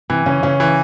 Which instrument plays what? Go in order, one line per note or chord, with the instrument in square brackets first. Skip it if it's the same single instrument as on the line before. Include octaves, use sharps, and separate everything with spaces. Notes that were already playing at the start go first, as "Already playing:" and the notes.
[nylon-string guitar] C3 [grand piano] E3
[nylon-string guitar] C#3 [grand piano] C#4
[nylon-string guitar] C#3 [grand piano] C#4
[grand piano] E3